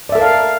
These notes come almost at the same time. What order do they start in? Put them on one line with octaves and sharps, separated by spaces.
D5 E5 A4 A#4 F5